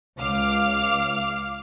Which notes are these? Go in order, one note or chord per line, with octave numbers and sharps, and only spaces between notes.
C#2 F5 D6 F6